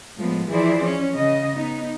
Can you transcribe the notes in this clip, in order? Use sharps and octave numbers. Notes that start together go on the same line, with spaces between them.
A2 F3 G#3 B3
E3 F3 E4 G#4 C5 D5
C#4
C#3 D#5
B3 D#4